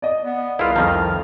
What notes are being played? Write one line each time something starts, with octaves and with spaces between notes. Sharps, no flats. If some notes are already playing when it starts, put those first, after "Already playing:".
D5 D#5
B3
C2 E4 F4 G#4 A#4 B4 F5 F6
F2 D#3 F3 A#5